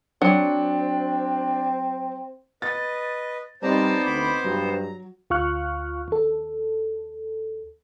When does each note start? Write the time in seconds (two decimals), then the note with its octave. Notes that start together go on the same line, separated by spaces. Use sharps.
0.22 F#3 C4 D4
2.62 B4 D#5 A6
3.63 G3 B3 C4 D#4 C5 D5 A5 A#5
4.06 D2 B5 D6
4.44 G2 F#3 A#5
5.30 D2 F4 F5 C#6 F6 F#6
6.08 D#2 A4